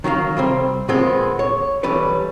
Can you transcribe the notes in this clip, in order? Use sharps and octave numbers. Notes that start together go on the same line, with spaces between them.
D#3 F#3 A#3 F5
C3 G3 C4
A#2 F3 G#3 B3 C4
C#5
B1 E3 G3 B4 C#5